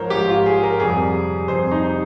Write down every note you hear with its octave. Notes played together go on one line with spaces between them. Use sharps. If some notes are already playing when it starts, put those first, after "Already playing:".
Already playing: G#2 F3 A#4 C5 C#5
G#2 F3 G4
F4
G#4
A#4
F2 C3 G3 G#4
F2 C3 G3 C5
D#4